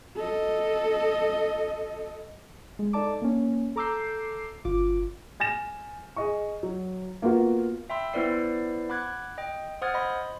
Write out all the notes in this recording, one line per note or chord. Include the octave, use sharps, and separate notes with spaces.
A4 D#5
G#3
D#4 A4 D5 A5 D6
A#3 C#4
A4 A#5 D6 E6 G6 C7
G1 F4 D6
G#5 A6 A#6 E7
G#4 D#5 C#6
F#3
A#3 B3 F4 F#4
E5 G5 B5 C6 E6
B3 E4 B4 C5 D5 C7
F#5 B5 D6 F#6 G#6
D#5 G5
C5 F#5 D#6 F6 G#6 A6
D#5 B5 C6